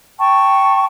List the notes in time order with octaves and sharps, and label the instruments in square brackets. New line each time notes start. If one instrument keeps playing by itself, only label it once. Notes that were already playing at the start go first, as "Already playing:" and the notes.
[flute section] G5 A5 C#6